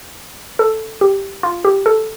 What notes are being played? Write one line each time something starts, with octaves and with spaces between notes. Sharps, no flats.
A4
G4
F4
G4
A4